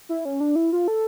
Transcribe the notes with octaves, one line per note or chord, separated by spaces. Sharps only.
E4
C#4
D4
E4
F4
A4